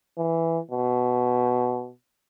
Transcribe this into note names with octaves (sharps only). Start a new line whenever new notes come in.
E3
B2